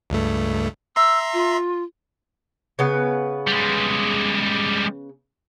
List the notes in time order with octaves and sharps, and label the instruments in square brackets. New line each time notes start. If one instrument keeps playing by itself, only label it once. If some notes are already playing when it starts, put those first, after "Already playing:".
[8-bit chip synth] C#2 G2 A3
[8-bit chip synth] E5 A#5 C6 [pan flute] E6
[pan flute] F4
[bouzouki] C#3 B3 B4
[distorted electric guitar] G3 G#3